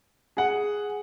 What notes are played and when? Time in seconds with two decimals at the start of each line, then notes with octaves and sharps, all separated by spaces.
0.37 G#4 F#5